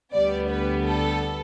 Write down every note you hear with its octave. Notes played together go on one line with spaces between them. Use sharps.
D2 D3 G3 B3 D5
B4
A4